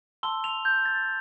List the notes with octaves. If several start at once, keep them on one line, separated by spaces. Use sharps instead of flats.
A5 C6 E6 G7
F7
G6
A6